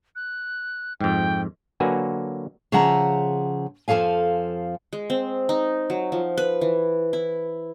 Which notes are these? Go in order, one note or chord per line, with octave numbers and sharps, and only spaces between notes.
F#6
F2 G#2 G5
D3 F#3 A#3 F#4 B4 G#5
C#3 F3 G#4 E5 F#5 A#5
F2 F3 G#4 A4 F5 G#5
G#3
C4
D#4
F#3
F3
B4
E3
E4